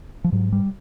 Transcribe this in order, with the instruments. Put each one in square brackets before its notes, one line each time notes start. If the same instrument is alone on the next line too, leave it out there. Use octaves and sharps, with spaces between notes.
[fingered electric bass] F3
G#2 F#3
G3